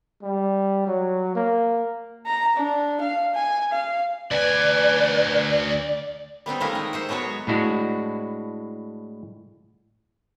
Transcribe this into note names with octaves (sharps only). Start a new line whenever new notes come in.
G3
F#3
A#3
A#5
D4
F5
G#5
F5
D2 B4 D5 G#5
G3 B3 C4 D#4
D#3 G#3 A3 E4 F4 A#4
D#4
C5 E5 F#5
F#3 G#3 B3 F#4 C#5
A2 G#3 D4 E4 F#4